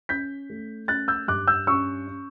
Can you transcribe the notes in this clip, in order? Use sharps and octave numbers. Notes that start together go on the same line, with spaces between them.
C#4 G6 B6
A3
C#4 F#6 A6
E6 G6
G2 D6 F#6
E6 G6
C#4 C#6 E6
C#4